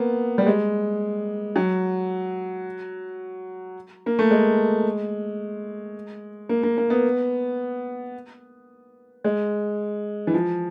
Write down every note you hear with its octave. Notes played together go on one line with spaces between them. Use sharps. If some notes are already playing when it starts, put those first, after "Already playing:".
Already playing: A#3 B3
G3
G#3
F#3
A#3
A3
G#3
A#3
A#3
A#3
B3
G#3
E3
F3